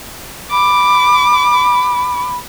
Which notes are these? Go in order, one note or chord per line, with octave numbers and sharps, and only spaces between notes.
B5 D6